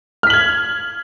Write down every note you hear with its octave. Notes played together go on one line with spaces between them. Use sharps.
F6 G#6 B6 F#7